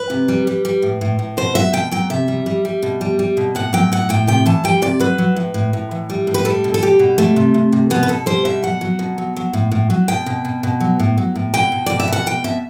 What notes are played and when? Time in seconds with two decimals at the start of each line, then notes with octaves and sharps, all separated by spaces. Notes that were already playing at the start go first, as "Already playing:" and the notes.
Already playing: B4
0.10 C3
0.28 G3
0.47 G3
0.65 G3
0.82 A2
1.01 A2
1.19 A2
1.37 B2 C5
1.55 F#3 E5
1.73 B2 G5
1.91 F#3 G5
2.10 C3 E5
2.28 G3
2.46 G3
2.65 G3
2.82 B2
3.01 G3
3.19 G3
3.37 B2
3.55 A2 F#5
3.73 F#3 G5
3.92 A2 F#5
4.09 A2 G5
4.27 C3 G5
4.46 E3 A5
4.64 G3 G5
4.82 C3 D5
5.00 F#3 B4
5.18 F#3
5.36 A2
5.54 A2
5.73 A2
5.91 E3
6.10 G3
6.27 A2
6.34 B4
6.45 G3 A4
6.64 B2
6.74 A4
6.82 G3 G4
6.99 B2
7.18 G3 A3
7.36 C3
7.54 C3
7.72 C3
7.90 B2 B3
8.03 B4
8.08 B2 A4
8.26 G3 C5
8.45 B2 E5
8.63 F#3 F#5
8.81 F#3
8.99 B2
9.18 F#3
9.36 F#3
9.53 A2
9.72 A2
9.90 F#3
10.08 B2 G5
10.26 B2
10.45 B2
10.63 B2
10.80 F#3
10.99 A2
11.18 F#3
11.36 A2
11.54 B2 G5
11.72 B2
11.86 B2 D5
12.00 E5
12.08 B2 F#5
12.26 B2 G5
12.44 B2 E5